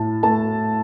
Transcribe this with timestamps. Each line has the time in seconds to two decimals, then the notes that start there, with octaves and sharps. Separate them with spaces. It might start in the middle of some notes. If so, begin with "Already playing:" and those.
Already playing: A2 A5
0.23 A3 A5